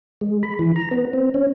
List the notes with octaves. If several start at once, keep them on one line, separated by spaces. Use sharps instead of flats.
G#3
B5
E3
A#5
B3
C4
C#4